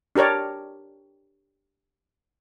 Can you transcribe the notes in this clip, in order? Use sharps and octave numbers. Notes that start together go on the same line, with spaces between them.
D4 G4 A#4 C#5 D5